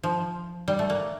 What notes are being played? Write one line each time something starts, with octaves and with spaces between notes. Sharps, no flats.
F3
G3
A3
A#3